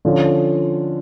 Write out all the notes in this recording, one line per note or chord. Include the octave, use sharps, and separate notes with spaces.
D3 F3 C#4 F4